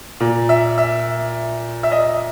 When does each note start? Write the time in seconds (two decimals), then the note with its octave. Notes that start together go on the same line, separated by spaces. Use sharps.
0.20 A#2
0.49 E5
0.78 E5
1.83 E5
1.92 D#5